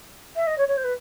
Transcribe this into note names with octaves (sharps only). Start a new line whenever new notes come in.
E5
D#5
C#5
C#5
C5
B4